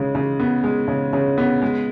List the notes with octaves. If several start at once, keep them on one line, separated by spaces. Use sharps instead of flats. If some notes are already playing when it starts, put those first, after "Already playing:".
Already playing: C#3 G#3
C#3
B3
G#3
C#3
C#3
B3
G#3